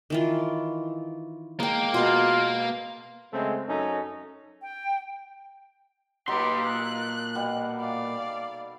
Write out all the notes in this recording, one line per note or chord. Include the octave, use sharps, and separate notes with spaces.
D#3 E3 F4
G#3 A#3 A#4 G5
B2 F4 C6
C#3 G#3 A3 C4
F#2 C#4 D#4 A4
G5
A#2 F#3 D#4 G4 A4 B4 C6
F#6
B2 G3 F#5
D5 F5